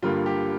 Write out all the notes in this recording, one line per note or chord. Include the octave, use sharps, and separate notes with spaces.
G2 D3 G3 A#3 F4
G4